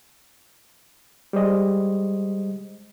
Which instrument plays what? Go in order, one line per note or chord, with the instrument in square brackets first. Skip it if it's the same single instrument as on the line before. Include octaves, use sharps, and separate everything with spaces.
[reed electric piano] G3 G#3 C5 D#5